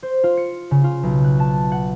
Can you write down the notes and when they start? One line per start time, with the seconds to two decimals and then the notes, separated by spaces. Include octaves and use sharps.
0.03 C5
0.24 F4
0.37 C#7
0.71 C#3
0.84 F4
1.03 B1
1.24 F#6
1.40 A5
1.72 F#5